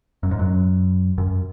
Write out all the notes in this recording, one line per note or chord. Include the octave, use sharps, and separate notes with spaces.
F#2
G#2
F#2
F#2